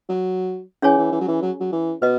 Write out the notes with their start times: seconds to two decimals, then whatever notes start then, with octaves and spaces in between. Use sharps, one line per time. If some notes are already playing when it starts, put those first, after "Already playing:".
0.09 F#3
0.82 E3 C#4 G#4 C#5 G#5
0.98 E3
1.12 E3
1.21 F#3
1.28 E3
1.42 F#3
1.60 F#3
1.72 E3
2.02 B2 B4 D#5